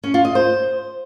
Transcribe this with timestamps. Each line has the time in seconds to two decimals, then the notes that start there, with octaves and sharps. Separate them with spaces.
0.04 C#4
0.14 F4
0.25 D#5
0.35 C5